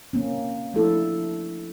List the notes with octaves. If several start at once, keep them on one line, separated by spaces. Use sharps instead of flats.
A#3 C4 C#4
F3 A3 D4 E4 A4